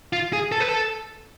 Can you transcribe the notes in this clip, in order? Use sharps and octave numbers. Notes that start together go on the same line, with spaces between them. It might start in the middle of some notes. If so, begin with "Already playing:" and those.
F4
G#4
A4
B4
A4